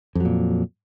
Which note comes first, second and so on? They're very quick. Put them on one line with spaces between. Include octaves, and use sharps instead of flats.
F2 F#3 A#2